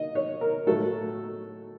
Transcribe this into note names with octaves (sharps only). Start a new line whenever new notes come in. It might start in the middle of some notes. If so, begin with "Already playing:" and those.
Already playing: D#5
C#5
A#4
A2 F#3 A3 A4